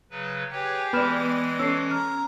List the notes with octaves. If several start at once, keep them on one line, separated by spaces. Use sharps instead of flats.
C#3 F#3 B4
G4 G#4 B4 C#5
E3 G#3 B3 D5 B5 F6 E7
C#4 A4 E6 C7
A#5 F6